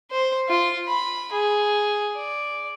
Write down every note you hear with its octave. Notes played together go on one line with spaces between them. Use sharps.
C5
F4
B5
G#4
D5